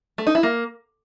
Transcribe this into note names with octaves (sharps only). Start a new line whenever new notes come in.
A3
D#4
E4
A#3